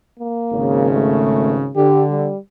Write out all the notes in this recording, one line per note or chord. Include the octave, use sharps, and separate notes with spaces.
A#3
G#1 C#3
A3
D3 G4
G3